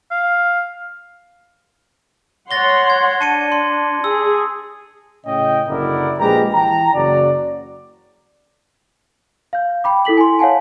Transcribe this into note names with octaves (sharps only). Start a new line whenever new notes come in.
F5
C#5 F#5 C6 A6 A#6 G7
G#6
D4 A5 C#7 D#7
C6
G#4 E6
A2 C#3 C#4 D#5 G5
F#1 D3 E4 A#4 D5 F#5
A#1 G#3 G4 B4 A#5
E3 G5 A5 A#5
F#1 C#3 F#4 D5
F5 G6
G5 B5 D6
E4 A4 B6 F#7
G#5 C6
C#5 F5 F#5 G#5 A5